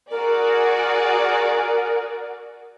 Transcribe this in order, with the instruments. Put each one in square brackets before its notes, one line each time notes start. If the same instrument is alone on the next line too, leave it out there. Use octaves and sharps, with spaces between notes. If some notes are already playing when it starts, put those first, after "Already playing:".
[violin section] F#4 G#4 D5 [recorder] A#4